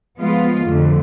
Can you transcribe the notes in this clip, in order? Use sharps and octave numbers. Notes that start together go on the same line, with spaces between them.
F3 G#3 B3 F4
F2 D3 A3